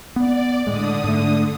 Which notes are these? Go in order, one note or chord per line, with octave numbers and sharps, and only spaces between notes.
B3 D5
A2 D3 G#3 D#6
G#2 A3